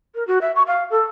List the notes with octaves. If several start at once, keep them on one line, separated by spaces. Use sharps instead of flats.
A#4
F#4
E5
C#6
F5
A4